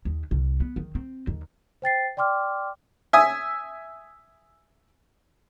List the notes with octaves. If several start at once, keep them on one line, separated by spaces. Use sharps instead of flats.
D#2
C2
B3
D#3
C4
D#2
C5 G5 A6 C7
D5 G5 C6 D6 F6
E5 G#5 D#6